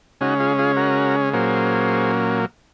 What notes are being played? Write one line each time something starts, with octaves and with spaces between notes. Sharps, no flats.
C#3 G#3 C#4 D#4 F#4
F4 G#4
F4 G#4
F#4 A#4
A#2 F#3 A#3 C#4 G#4 C5